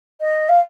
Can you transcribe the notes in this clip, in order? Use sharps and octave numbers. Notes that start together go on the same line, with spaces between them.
D#5
F5